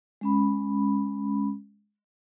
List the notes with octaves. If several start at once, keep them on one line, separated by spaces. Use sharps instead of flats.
G#3 C#4 B5